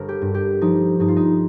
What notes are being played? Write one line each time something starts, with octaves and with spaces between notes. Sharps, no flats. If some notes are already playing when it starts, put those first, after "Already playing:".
Already playing: G1 A#4
G4
G2
G4
F3 D#4
G2 D#4
F4
D#4